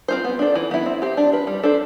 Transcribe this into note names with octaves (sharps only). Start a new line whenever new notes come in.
C4 F4 C5
B3
D4 A4 D5
E3
B3 E4
C4
G4 C5
D4
F4 B4
G3
D4 A4 C5